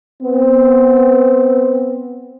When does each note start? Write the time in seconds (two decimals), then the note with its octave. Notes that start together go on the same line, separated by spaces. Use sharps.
0.22 B3 C4